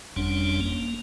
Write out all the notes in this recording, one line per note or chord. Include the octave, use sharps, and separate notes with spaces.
F#1 F2 G3 C#4 D4
A#3